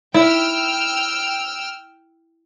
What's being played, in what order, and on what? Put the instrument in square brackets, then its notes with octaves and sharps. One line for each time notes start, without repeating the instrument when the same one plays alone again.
[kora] E4 [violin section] G5 E6 F6